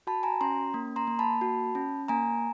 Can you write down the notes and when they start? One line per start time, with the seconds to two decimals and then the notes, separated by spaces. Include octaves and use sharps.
0.07 F#4 A5 B5
0.23 G#5 A#5
0.41 C#4 A#5 C6
0.74 A#3
0.96 A#5 C6
1.07 A#3
1.19 A5 B5
1.41 F#4
1.75 C#4
2.08 A#3 G#5 A#5